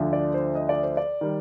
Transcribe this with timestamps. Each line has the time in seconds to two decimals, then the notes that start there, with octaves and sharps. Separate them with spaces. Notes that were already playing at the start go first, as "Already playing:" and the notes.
Already playing: D2 D3 F3
0.13 D5
0.34 C5
0.55 D#5
0.69 D5
0.83 C5
0.97 D5
1.21 D#3 G3